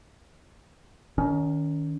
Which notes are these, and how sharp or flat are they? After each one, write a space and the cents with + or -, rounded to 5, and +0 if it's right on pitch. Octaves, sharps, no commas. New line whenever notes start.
D#3 +0 C#4 +35